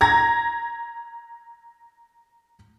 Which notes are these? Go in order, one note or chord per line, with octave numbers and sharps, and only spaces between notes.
A#5 G#6 A#6